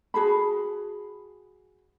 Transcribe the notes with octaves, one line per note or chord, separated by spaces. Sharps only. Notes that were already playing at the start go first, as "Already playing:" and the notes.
F#4 G#4 A5 B5